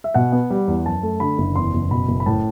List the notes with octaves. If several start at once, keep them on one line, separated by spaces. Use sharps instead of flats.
E5
B2 F#5
B3
G3
E2
F#2 A5
A3
D3 B5
F#1
E2 C6
F#1
B2 B5
F#1
B5
A2 A5